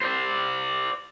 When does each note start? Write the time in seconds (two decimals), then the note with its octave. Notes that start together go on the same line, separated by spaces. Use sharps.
0.02 C5 D5